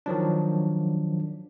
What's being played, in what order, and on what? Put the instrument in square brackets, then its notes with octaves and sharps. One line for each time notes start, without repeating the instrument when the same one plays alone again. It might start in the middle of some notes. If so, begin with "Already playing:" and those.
[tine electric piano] D#3 F3 F#3 D4